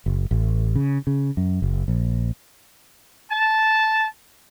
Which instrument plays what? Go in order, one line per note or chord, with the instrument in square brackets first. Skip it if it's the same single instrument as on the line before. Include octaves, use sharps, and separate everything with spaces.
[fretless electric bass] F#1
A1
C#3
C#3
F#2
F#1
A#1
[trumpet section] A5